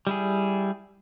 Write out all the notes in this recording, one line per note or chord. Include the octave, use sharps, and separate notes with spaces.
G3 E4 G#4